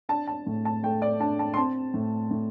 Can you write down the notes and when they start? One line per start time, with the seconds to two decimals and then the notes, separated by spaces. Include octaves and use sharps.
0.09 D4 A5
0.27 A5
0.47 A2
0.65 A5
0.83 A3 G5
1.02 D5
1.20 D4 A5
1.39 A5
1.54 C6
1.57 C4 A5
1.94 A2
2.31 A2